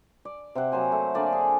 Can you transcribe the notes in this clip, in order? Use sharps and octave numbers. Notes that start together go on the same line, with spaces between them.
D5
C3 C4 C5 F#5
F#3 A#3 C5 G#5
A3 E5
D3 A#3 D5 G#5
G#4